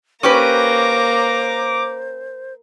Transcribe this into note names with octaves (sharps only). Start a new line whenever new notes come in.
A#3 C#4 G4 B4 C5 A#5 D6